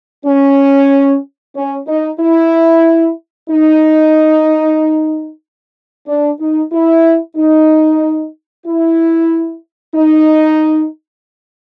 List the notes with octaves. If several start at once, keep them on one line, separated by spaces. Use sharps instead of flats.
C#4
C#4
D#4
E4
D#4
D4
D#4
E4
D#4
E4
D#4